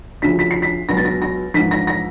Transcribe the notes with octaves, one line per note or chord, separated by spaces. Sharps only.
D2 C#3 F3 B6
B6
C7
B6
C#2 B2 F#3 A#6
A6
A#6
A#6
A#1 G#2 E3 B6
A#6
A#6